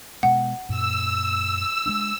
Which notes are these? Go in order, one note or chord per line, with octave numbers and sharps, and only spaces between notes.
B2 G#3 B3 F#5
F#2 A#2 E6
G#3 B3 D4